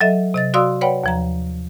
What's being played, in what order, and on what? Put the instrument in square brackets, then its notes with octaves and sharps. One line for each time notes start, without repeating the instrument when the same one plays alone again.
[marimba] F#3 A4 D#5 E5
C3 D#5 A6
F#4 D5 F5 C6 D#6 E6
B4 C#5 D5 F#5 G5 B5
D#2 F3 A#5